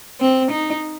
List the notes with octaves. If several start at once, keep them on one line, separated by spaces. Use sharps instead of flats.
C4
D#4